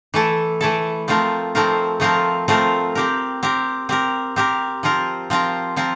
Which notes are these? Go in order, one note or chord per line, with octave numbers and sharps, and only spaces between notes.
E3 A3 E4 A4
E3 A3 E4 A4
F3 A3 C4 F4 A#4
F3 A3 C4 F4 A#4
F3 A3 C4 F4 A#4
F3 A3 C4 F4 A#4
C4 G4 A#4
C4 G4 A#4
C4 G4 A#4
C4 G4 A#4
F3 C4 F4 A#4
F3 C4 F4 A#4
F3 C4 F4 A#4